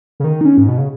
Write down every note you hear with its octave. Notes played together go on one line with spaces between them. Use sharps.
C#3
D#3
D#4
C#4
G#2
B2
C#3